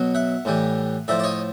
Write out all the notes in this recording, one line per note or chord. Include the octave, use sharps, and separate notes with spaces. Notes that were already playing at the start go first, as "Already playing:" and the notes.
Already playing: B2 F#3
E5 F#5
A2 E3 G3
A2 F3 D5 E5
D5
C#5 D#5